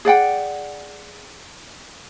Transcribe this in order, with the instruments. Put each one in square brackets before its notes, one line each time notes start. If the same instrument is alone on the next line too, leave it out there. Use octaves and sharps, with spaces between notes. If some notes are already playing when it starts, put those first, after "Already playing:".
[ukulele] G#4 D5 F#5 G5